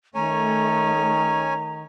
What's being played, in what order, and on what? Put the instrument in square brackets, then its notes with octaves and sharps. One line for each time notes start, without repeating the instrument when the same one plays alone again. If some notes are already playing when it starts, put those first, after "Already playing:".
[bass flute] D#3 [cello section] A3 [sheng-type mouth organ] C#4 C#5 G#5 [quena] A#5